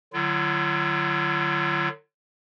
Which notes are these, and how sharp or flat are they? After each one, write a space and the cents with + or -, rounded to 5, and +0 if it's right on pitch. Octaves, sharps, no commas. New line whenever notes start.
D3 +35 F#3 +0 F4 -40